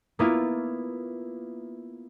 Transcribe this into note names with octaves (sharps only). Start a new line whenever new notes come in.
A#3 B3 E4 F4